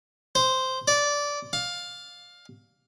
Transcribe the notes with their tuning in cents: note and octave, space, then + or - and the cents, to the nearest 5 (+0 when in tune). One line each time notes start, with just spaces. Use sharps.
C5 -5
D5 -15
F5 +15